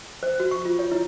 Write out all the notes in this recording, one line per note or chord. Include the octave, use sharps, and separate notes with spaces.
C5
F#4
C#6
F4
C#5
E4